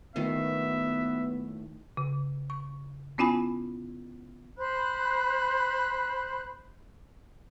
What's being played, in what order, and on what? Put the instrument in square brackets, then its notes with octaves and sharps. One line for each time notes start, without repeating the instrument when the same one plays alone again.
[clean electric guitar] B1 A2 [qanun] D#3 F4 [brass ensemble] B3 [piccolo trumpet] E5
[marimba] C#3
C#6
B3 C#4 E4 F4 G#5 B5
[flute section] C5 B5 F#6